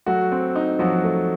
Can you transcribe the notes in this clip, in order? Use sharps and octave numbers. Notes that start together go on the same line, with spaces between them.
F#3 A3 F#4
C4
D#4
F3 F#3 F#4
A3